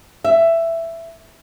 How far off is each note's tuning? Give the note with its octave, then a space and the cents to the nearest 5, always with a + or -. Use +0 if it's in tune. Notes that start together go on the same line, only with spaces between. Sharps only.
E5 +10